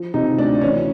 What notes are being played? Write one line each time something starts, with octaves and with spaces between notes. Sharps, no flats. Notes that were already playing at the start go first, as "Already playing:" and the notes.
Already playing: F3
C3 D#4
D2 D4
E3 C#4